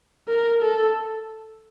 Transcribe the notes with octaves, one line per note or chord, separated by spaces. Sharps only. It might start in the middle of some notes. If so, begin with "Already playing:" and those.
A#4
A4